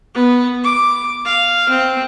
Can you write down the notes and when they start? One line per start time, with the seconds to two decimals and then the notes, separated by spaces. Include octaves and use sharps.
0.15 B3
0.64 D6
1.25 F5
1.69 C4